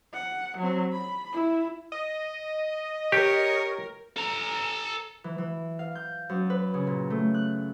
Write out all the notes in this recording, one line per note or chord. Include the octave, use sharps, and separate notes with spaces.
F#5
F#3 C4
B5
E4
D#5
G4 A#4 C#5
A4 A#5
E3
E3
F5
G6
F#2
B4
C#3
A#2
A3
F#6